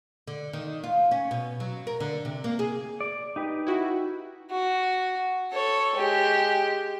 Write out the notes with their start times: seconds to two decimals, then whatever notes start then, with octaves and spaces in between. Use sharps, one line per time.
0.27 D3
0.53 D#3
0.84 F4
1.11 C#4
1.31 B2
1.60 F#3
1.87 A#4
2.00 D3
2.25 C3
2.44 A#3
2.59 G#4
3.01 D5
3.36 D#4 G4 B4
3.67 E4 F#4
4.51 F#4
5.53 A4 C#5
5.96 G#3 G4